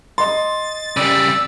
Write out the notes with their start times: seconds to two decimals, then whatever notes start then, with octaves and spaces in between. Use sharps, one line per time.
0.18 D#5 C6 A6
0.97 C#3 G3 D5 E6